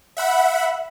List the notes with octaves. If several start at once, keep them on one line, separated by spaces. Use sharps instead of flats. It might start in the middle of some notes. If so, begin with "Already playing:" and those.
E5 F#5 B5